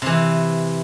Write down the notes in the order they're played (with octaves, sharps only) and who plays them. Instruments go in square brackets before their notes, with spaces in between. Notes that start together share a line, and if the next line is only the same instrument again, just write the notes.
[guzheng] C3 E3